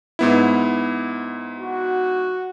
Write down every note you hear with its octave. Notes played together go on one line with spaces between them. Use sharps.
G#2 B3 E4
F#4